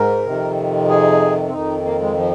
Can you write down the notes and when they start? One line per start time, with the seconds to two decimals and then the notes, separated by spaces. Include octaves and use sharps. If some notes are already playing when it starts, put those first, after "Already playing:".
Already playing: G#2 A#4
0.26 F2 C3 D#3
0.89 G#4
1.48 C4
1.53 F2 D#3 D#4
1.85 A#3
2.01 G#3
2.17 F3